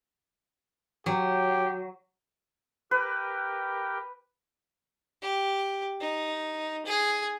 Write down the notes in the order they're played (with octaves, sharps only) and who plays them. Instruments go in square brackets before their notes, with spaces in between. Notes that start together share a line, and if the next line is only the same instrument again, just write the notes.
[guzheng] F#3 [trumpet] G4
[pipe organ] G4 A#4 G5 [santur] B4
[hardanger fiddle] G4
D#4
G#4